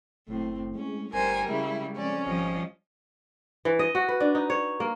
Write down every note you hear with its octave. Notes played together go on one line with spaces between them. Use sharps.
F#1 A2 C4
G#3 C#4
G1 G3 A#4 C5 G#5
C#3 G#3 E4
F2 C#4 D5
G#1 F3 G3 D#5
E3
D#5
F#4
B4
D4
D#4
C#5
A#3